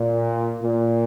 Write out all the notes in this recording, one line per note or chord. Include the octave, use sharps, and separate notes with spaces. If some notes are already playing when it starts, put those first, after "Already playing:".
Already playing: A#2
A#2